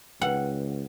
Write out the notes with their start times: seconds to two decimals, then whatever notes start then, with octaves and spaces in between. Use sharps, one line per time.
0.21 C#2 B4 F#5 G5